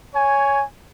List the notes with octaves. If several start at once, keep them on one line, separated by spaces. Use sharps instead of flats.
C#5 G#5